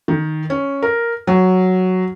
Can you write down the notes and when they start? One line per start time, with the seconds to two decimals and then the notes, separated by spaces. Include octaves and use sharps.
0.08 D#3
0.50 C#4
0.82 A#4
1.27 F#3